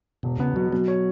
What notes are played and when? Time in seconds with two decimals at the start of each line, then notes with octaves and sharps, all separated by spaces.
0.23 E1 B2
0.39 C#3 B3
0.56 B2 F#3
0.72 B2 F#3
0.88 C#5